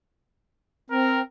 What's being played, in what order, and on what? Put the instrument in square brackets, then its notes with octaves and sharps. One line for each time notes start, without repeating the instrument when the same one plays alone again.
[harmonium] C4 [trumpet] A#4